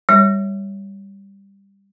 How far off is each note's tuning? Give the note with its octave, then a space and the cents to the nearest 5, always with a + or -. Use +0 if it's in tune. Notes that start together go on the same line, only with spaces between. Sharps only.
G3 +10 C#5 +0